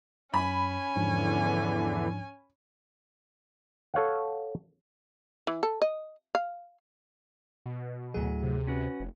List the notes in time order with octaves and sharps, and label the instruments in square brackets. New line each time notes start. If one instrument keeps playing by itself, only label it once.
[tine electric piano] F#2 [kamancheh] C#4 G#5 [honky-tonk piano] B5
[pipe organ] E2 D3 E3 [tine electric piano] G#2 F3 D4
[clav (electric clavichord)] A4 C#5 F5 F#5
[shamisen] E3
A4
D#5
F5
[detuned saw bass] B2
[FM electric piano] D2 G#4 [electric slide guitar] A2 F#3
[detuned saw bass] C3
[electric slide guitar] C#4 F#4 B4
[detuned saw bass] F1